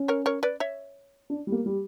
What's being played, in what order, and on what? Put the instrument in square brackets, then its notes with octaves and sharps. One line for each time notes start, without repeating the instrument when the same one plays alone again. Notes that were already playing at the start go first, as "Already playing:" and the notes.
Already playing: [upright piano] C#4
[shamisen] A#4 C#5
A#4 C#5
B4 D5
C#5 E5
[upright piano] D4
G3
A#3
G3